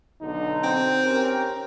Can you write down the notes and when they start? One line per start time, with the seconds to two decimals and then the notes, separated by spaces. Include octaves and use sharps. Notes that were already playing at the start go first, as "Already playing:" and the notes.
0.22 B1 D3 D#4
0.64 C4
1.03 C#4 G4 A#4